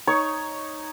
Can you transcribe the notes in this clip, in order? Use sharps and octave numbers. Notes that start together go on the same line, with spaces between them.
D#4 C#5 C#6